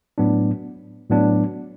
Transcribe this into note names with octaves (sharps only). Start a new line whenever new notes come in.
A2 F#3 B3 D4
A2 F#3 B3 D4